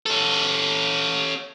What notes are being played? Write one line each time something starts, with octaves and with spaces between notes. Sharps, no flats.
C#4 A4